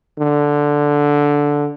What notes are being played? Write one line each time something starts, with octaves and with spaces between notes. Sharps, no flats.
D3